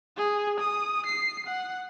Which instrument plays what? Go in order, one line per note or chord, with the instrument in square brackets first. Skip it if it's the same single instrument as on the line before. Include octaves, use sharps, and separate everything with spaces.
[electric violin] G#4
D#6
C7
F#5